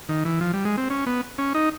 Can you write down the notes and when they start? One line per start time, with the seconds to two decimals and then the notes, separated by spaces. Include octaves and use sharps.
0.09 D#3
0.25 E3
0.41 F3
0.54 G3
0.65 G#3
0.78 C4
0.90 C#4
1.07 B3
1.38 C#4
1.55 D#4